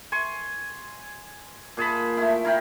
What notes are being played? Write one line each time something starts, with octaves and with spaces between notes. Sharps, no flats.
G#5 C6 C#6
A#2 G#4 A5 B5
A3 E4
E4 A#4 F5 G5